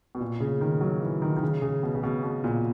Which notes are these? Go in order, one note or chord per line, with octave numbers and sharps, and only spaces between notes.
B2
A#2
C#3
D#3
F#3
E3
D#3
D#3
C#3
C#3
B2
C#3
B2
B2
A#2